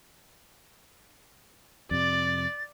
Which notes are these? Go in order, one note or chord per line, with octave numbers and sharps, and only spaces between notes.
F2 C3 D5 A6